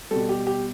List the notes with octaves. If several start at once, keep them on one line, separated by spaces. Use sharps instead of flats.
B2 G3 A4
G4
G4